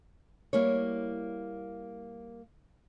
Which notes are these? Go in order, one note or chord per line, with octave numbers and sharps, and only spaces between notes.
G3 A#3 E4 C#5